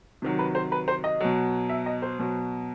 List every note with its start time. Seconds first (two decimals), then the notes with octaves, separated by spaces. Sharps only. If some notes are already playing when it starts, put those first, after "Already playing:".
0.22 C3 D#3 F#3
0.39 B4
0.55 C5
0.72 B4
0.88 C5
1.04 D#5
1.20 B2 F#3
1.69 E5
1.86 D#5
2.02 C5
2.19 B2 F#3